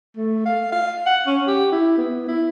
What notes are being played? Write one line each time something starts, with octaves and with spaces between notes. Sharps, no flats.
A3
F5
F5
F#5
C#4
G4
E4
B3
E4